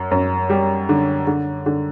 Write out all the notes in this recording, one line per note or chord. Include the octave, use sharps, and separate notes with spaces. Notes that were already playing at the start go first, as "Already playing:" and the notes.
Already playing: F#2
F#2
G3
D3
D3
D3